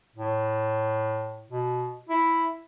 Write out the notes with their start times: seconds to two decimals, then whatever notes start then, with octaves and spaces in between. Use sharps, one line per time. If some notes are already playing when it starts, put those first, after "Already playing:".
0.16 A2
1.51 B2
2.09 E4